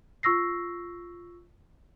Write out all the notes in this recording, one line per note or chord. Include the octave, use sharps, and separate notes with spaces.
F4 C#6 E6 A#6 C7